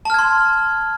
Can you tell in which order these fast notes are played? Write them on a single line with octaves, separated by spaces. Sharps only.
A5 F6 G#6 C6